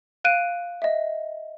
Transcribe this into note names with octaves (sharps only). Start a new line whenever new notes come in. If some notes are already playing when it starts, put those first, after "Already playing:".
F5 F#6 D7 D#7
D#5 E5